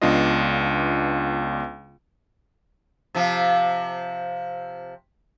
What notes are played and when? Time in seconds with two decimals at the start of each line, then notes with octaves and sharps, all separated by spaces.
0.02 C#2 B3 D4 F4 D#5
3.15 C3 F3